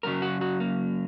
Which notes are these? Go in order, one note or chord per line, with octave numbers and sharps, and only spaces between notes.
F#2 C#3 F#3 A#4
F#4
F#4
A#3